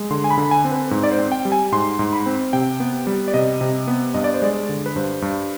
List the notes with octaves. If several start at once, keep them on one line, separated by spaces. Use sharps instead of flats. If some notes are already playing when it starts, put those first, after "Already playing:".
Already playing: G#3
D3 C6
G#5
B5
D3
B5
G#5
C4
B4
G#2
D5
C5
C4
G5
G3
G#5
G#2 C6
G#2
B5
C4
C3 G5
B3
G3
D5
C3 D#5
C3
B3
G2 D#5
D5
C5
G#3 D5
D3
B4
G2 C5
G2